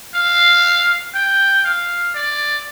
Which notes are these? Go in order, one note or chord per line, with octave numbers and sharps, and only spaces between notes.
F5
G5
F5
D5